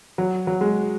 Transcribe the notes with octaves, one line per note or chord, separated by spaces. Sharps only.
F#3
F#3
G#3